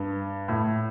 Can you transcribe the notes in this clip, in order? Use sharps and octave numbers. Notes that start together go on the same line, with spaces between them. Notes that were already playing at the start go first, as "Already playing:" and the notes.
Already playing: G2
A2